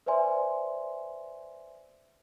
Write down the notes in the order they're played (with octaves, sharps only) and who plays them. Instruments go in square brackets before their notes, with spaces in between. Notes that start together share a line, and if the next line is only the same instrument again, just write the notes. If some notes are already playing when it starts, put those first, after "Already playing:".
[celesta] B4 C5 D5 E5 G#5 C6